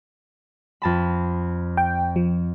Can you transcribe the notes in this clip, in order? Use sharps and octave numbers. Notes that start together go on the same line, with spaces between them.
F2 A5 B5
G5
F3